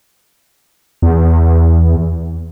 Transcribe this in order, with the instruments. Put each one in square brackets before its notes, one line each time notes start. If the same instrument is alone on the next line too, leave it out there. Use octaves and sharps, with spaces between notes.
[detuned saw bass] E2